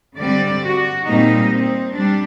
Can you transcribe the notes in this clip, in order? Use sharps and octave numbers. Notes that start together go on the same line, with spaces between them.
D3 G3 C4 D5
F#4
A#2 G3 C4 D#4
C4
G3 D4